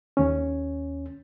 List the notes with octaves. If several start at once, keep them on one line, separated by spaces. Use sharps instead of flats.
D#2 C#4